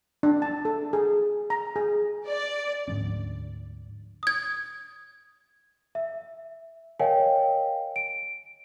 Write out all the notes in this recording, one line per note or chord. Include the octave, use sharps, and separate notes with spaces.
D4
A5
A4
G#4
A#5
G#4
D5
D2 G#2 F3 C#4
D#6 G#6
E5
A#4 C#5 D#5 F5 G5 G#5
D7